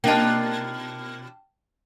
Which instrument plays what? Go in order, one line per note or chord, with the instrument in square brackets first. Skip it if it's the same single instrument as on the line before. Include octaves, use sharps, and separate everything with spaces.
[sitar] B2 D4 F4 [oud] A#3 D#4 [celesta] G5 A5